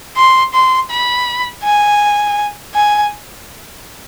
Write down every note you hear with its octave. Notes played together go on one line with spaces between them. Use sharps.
C6
C6
B5
G#5
G#5